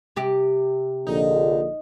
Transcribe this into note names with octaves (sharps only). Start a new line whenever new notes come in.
C3 G4
A#1 D3 D#4